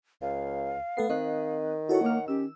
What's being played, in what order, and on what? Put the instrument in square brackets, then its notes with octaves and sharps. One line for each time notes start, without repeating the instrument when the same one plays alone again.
[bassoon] C#2 [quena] F5
[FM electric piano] A3 A4 C7 [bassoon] B3
[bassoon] D#3 [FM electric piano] C4 D#5 F#6
[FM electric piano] E4 A4 C#5 [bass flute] F#4 [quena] F#5
[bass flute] A#3 [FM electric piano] C#5 D6 F6
[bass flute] C#4 [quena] G4 [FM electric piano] E6